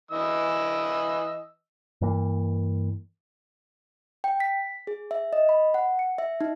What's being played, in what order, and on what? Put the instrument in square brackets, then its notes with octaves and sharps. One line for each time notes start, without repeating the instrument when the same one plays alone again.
[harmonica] E3 D#5 E6
[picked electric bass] G2 E3 A#3
[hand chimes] G5
B6
G#4
E5
D#5
B5
F#5
C#7
E5
D#4